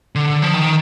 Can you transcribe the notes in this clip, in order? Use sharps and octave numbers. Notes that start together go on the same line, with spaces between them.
D3
F3
D#3